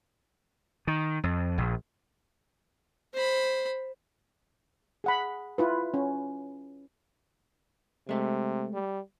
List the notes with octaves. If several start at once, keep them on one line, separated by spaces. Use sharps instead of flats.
D#3
F2
A#1
C5 B5
G#4 F#5 B5
E4 F4 B4
C#4
C3 G#3 A3
G3